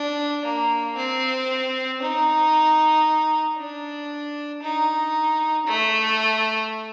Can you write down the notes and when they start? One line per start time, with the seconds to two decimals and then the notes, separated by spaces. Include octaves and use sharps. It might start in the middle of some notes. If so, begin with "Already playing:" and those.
Already playing: D4
0.45 A#3
0.97 C4
2.02 D#4
3.58 D4
4.62 D#4
5.67 A3